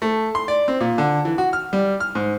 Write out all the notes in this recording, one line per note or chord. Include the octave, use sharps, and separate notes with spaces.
A3
C6
D5
C4
A#2
D3
E3
F#4
F6
G3
F6
G#2